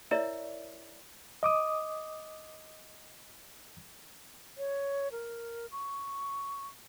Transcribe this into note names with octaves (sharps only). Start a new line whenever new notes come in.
E4 A#4 C#5 D5 E5
D#5 D6 D#6
C#5
A#4
C#6